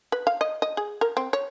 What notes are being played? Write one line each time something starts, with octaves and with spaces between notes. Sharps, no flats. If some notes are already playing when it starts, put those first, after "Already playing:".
B4
F5
D#5
D#5
G#4
A#4
C4
C#5